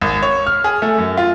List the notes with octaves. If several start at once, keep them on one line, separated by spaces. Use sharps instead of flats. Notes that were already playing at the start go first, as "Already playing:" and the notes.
G#1
C#5
F6
G#4
A3
F#2
F4